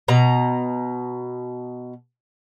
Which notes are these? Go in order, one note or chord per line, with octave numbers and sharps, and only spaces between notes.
B2 A#5